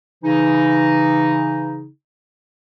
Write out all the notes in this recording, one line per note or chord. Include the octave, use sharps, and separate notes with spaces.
C#3 E3 D#4